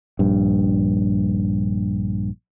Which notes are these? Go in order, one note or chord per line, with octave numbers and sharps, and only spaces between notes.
A#1 G2